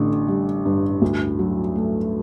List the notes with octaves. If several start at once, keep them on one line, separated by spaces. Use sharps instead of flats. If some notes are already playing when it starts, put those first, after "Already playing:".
Already playing: A1 D3
G3
G2
D2
F#3
A3